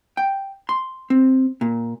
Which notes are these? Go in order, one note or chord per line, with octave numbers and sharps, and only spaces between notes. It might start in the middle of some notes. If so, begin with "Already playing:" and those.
G5
C6
C4
A#2